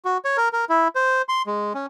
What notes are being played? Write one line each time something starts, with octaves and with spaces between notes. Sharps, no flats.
F#4
C#5
A#4
A#4
E4
C5
C6
G#3
C#4